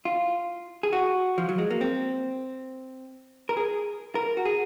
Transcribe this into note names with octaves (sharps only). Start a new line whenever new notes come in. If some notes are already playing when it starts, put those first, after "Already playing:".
F4
G#4
F#4
F3
F#3
G#3
A#3
C4
A#4
G#4
A#4
F#4
G#4